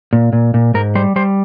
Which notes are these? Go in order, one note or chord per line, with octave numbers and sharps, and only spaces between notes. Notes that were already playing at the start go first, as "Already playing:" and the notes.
A#2
A#2
A#2
G#2 A#4
G3 C5
G3 C5